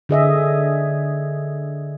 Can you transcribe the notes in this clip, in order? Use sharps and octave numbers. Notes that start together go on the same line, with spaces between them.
D3 G#4 D#5 E5